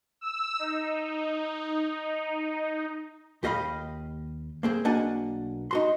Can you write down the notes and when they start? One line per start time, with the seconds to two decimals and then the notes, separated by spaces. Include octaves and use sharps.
0.21 E6
0.59 D#4
3.43 D#2 G4 D#5 F5 B5
4.63 A#3 C4 G#4
4.85 B1 A#3 D4 F#4 F#5 G#5
5.71 D#4 F#4 C6